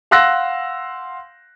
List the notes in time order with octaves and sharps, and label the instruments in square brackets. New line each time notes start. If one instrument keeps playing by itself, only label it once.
[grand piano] F5 F#5 C6 E6 F#6 A#6